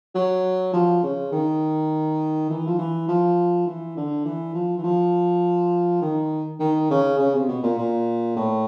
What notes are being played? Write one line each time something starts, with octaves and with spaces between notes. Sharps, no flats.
F#3
F3
C#3
D#3
E3
F3
E3
F3
E3
D3
E3
F3
E3
F3
D#3
D#3
C#3
C#3
C3
B2
A#2
A#2
A2